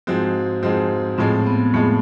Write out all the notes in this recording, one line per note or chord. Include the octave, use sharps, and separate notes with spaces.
G#2 F3 G#3 C4 F#4
G#2 F3 G#3 C4
A2 F3 G#3 C4
B3
A2 F3 G#3 A3